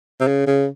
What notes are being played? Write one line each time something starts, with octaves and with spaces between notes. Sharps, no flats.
C3
C#3
C#3